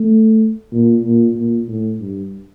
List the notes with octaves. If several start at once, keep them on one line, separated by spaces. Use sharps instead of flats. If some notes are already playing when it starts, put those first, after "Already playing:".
Already playing: A3
A#2
A#2
A#2
A2
G2